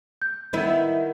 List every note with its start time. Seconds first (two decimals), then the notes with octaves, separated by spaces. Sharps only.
0.22 G6
0.53 D#3 B3 E4